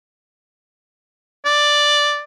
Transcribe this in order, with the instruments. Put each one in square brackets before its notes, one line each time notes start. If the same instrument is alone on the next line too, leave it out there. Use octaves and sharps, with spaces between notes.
[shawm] D5